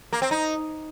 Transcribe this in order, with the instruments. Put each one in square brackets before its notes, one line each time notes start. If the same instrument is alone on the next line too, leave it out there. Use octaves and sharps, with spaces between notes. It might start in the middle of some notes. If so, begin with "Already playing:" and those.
[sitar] A#3
C4
D#4